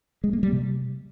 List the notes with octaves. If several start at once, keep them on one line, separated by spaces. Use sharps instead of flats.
G#3
A#3
G3
C3